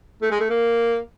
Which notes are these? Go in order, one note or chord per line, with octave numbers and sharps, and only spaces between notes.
A3
G#3
A3
A#3